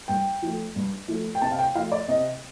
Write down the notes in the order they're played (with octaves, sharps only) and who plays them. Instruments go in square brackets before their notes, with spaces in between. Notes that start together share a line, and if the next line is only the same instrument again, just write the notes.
[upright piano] G2 G5
F3 A3
G2
F3 A3
G5
C3 A5
F5
G5
F3 A3 F5
D5
C3 D#5